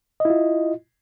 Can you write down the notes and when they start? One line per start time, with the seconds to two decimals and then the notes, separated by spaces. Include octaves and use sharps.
0.20 D#5
0.25 E4
0.30 F4